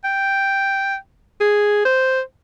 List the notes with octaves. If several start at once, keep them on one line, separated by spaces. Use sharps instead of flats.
G5
G#4
C5